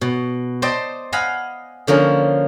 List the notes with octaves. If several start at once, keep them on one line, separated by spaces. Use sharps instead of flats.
B2
C5 D5 D#5 G5 A5
D#5 F5 F#5 G#5 B5
D3 F3 A#3 C#4